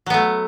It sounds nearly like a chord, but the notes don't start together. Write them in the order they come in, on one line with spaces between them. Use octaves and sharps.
F#3 B3 A3